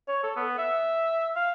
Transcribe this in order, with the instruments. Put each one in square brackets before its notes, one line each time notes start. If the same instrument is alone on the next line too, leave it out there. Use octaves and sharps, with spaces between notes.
[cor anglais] C#5
A4
B3
E5
F5